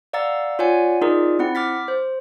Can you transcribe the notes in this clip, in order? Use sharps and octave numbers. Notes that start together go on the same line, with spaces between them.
D5 F5 F#5 A#5 E6 A6
F4 C#5 D5 F#5 G#5
D#4 F4 G#4 A#4 D5
C4 E4 F#5
D6 F6 A6 B6
C5